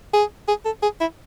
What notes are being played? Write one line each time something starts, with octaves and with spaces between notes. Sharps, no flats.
G#4
G#4
A4
G#4
E4